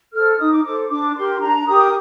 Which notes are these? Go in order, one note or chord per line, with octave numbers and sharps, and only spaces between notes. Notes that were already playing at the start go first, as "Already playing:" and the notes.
A4 C5 F6
D#4 D#6
D6
A4 C5 D6
D4 D6
G4 A#4 C6
D4 A#5
G4 A#4 D#6